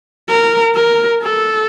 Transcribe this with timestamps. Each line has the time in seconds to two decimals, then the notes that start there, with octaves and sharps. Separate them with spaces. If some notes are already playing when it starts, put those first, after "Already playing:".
0.28 A#4
0.75 A#4
1.22 A4